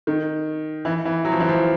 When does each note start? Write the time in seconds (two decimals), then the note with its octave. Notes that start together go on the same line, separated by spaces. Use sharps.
0.07 D#3
0.85 E3
1.05 E3
1.25 F#3
1.32 F3
1.40 E3
1.49 F3